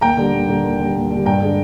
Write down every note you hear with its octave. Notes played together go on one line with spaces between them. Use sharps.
D#2 G5 A#5
D3 G3
D#2
D3 G3
D#2
D3 G3
D#2
D3 G3
G2 G5 A#5
D3 G#3 D4